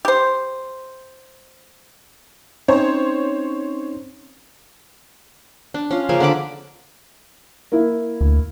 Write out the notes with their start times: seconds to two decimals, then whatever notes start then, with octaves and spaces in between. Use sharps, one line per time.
0.05 G4 C5
2.68 C4 C#4 D#4 C5 C#5
5.74 D4
5.91 C#4 F4
6.09 C#3 F3 A#3 G#5
6.20 D3 A5 B5 D6
7.72 A#3 E4
8.21 D2